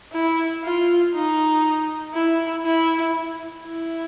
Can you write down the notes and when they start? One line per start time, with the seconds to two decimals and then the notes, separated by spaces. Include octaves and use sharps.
0.13 E4
0.64 F4
1.14 D#4
2.14 E4
2.66 E4
3.66 E4